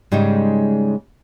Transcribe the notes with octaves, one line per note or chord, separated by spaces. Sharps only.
G#2 C#3 G3 G#3 D#4